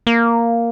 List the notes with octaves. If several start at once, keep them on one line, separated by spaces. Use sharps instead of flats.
A#3